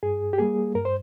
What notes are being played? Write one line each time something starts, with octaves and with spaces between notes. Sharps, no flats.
G2 G#4
G4
G3 A#3 G#4
G2 A#4
C5